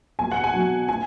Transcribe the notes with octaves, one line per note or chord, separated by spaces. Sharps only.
B2 A#3 F4 G#5
F#5
G#5
B2 F#3 B3 F#4
A#3 F4 G#5